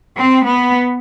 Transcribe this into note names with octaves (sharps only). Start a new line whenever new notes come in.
C4
B3